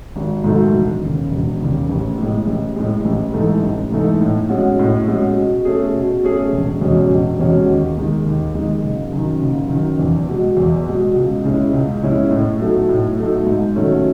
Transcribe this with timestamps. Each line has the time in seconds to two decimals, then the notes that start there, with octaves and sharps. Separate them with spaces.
0.16 G#1
0.44 G#2 D#3 F#3 A3
0.73 E1
1.02 D#2 C#3
1.31 E1
1.61 D#2 C#3
1.89 A1
2.18 A2
2.23 G#3
2.47 A1
2.76 A2 G#3
3.05 A1
3.34 G#2 E3 A3 D#4
3.63 A1
3.92 G#2 E3 A3 D#4
4.21 A2
4.49 G#3 C#4 F#4
4.79 A2
5.08 G#3 C#4 F#4
5.36 B2
5.65 A3 C#4 G#4
5.94 B2
6.23 A3 C#4 G#4
6.52 E1
6.81 E2 B2 G#3 C#4
7.10 E1
7.39 E2 B2 G#3 C#4
7.68 D#2
7.98 D#3 G#3
8.26 D#2
8.55 D#3 G#3
8.84 F#1
9.13 F#2 D#3
9.42 F#1
9.70 F#2 D#3
9.99 E2
10.28 B2 G#3
10.57 E2
10.86 B2 G#3
11.15 C#2
11.44 C#3 G#3 C#4 E4
11.73 C#2
12.03 C#3 G#3 C#4 E4
12.31 A2
12.60 F#3 A3 D#4
12.89 A2
13.17 F#3 A3 D#4
13.47 G#2
13.76 D#3 F#3 A3 C#4